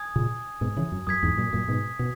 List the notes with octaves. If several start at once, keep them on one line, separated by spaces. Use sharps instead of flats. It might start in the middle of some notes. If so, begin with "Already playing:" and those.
Already playing: G#5 D#6 G#6
A#2 C#3
G#2 B2
C#3 E3
F#2
F#2 D#6 G#6 B6
E2 G#2
F#2 A#2
F#2 A#2
G#2 B2
B2